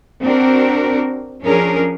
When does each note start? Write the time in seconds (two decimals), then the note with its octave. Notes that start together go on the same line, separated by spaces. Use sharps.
0.23 C4 D4 F#4 A#4
1.42 F3 C#4 D4 G#4 A#4